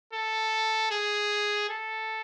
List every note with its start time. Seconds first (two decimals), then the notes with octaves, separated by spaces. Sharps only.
0.13 A4
0.91 G#4
1.69 A4